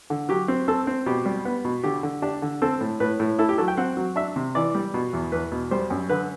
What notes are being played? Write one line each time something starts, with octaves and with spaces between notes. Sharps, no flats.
D3
F#3 G4
C4
C4 A4
C4
B2 G4
G3
B3
B2
D3 G4
D3
D4 G4
D3
C4 A4
A2
A2 B4
A2
E4 A4
G4
F#3 A4
G5
C4 F#5
F#3
D4 E5
C3
E3 D5
G3
B2
E2
E2 B4
B2
G3 C5
F#2
D3 B4